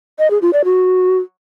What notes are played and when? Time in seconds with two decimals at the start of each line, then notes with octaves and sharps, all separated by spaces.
0.19 D#5
0.30 G#4
0.42 F4
0.53 D5
0.65 F#4